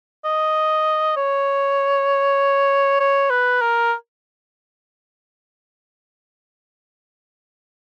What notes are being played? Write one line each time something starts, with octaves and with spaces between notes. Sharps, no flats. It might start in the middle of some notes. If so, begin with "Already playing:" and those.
D#5
C#5
C#5
B4
A#4